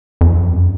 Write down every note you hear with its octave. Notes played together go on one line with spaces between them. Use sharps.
F2
F#2